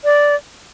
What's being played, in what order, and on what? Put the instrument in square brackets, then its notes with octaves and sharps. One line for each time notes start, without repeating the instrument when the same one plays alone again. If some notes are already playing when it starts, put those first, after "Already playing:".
[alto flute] D5